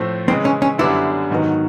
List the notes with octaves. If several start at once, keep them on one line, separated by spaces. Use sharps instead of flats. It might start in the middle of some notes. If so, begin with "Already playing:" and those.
Already playing: A2 F3 A3 C4
C#3 E3 G#3 C4
C#4
C#4
F#2 D3 G3 B3 D4 E4
G#2 D#3 F#3 B3